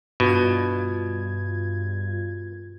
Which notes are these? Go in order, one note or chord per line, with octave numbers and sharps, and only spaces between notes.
G2 B2 F4 G#6